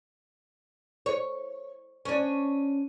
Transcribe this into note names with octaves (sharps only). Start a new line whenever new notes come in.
C#5
C#4 D4